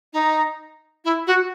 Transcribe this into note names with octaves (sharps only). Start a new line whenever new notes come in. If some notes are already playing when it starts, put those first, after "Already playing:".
D#4
E4
F#4